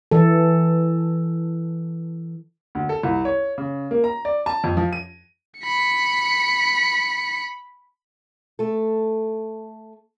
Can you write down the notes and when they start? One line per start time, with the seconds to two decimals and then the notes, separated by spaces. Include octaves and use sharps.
0.11 E3 A4
2.75 D2
2.89 A4
3.03 C2
3.25 C#5
3.58 C#3
3.91 A#3
4.04 A#5
4.25 D5
4.46 A5
4.64 F2
4.77 F3
4.93 D#7
5.61 B5 C#7
8.59 A3 A4